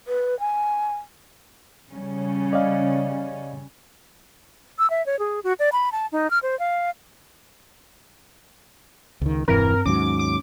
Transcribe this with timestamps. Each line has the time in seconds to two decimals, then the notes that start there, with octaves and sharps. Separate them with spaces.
0.08 B4
0.40 G#5
1.92 C#3 G3 C#4
2.53 D5 D#5 F5
4.79 E6
4.90 E5
5.06 C#5
5.19 G#4
5.44 F#4
5.59 D5
5.72 B5
5.92 A5
6.12 D#4
6.31 F6
6.43 C5
6.59 F5
9.21 C#2 D#3
9.48 E1 G2 E3 C4 A#4
9.86 D#2 G#2 F#3 C#4 D6
10.19 D6